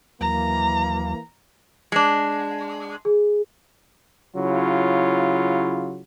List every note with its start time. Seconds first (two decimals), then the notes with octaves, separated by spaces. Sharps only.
0.21 D#2 E3 F#3 A#3 A#5
1.92 G#3 D4
3.05 G#4
4.36 C#3 F#3 E4 F4